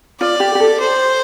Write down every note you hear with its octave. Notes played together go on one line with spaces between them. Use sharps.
F4 D5
G4
G4
A4
C5